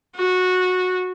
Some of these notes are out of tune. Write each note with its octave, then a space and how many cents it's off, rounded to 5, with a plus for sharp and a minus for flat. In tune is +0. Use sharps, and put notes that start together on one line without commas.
F#4 -15